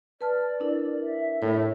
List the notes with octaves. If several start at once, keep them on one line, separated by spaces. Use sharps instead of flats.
B4 D5 A5 F6
D4 E4 A#4
E5
A2